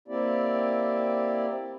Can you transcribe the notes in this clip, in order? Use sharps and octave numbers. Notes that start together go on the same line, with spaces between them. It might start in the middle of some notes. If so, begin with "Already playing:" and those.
A#3 C4 E4 G4 D5